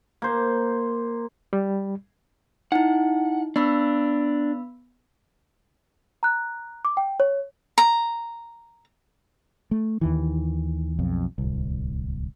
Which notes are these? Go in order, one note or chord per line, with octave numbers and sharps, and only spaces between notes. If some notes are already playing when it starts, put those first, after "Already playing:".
A#3 C5
G3
D#4 E4 F#5
B3 D4 B5 E6
A#5 F#6
D6
G5
C#5
A#5
A3
D#2 D#3 E3
B1 F2
D1 C2